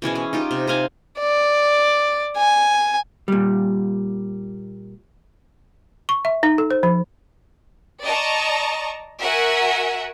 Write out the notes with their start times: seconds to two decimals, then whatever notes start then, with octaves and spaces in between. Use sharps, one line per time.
0.02 B2 E3 C#4 G#4
0.15 C#4
0.33 D#4 F4 G4
0.51 C3
0.67 C5 D#5 F5 G#5
1.19 D5
2.37 G#5
3.28 A#2 G3
6.09 C#6
6.25 E5
6.43 D#4
6.58 A4
6.71 C5
6.83 F3
8.03 D5 D#5 A5 A#5 C#6
9.20 F#4 A#4 E5 F#5 G#5